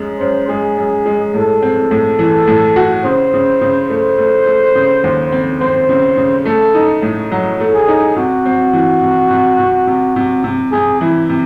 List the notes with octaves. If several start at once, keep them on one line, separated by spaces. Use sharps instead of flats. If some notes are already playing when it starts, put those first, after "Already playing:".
Already playing: F#2 G#3
F#2 C5
G#3 G#4
F#2
G#3
A2 A4
C4
A2
E3
A2
F#4
C#3 C5
C#3
C#3
A3 C5
A3
A3
C#3
D#2
C4
C4 C5
C#3
C#3
A3 A4
D#4
A2
F#3
A3
G#4
D#4
C3 F#4
C4
E3
C3
C3
C3
C3
C3
C3
C3 G#4
E3 E4
C3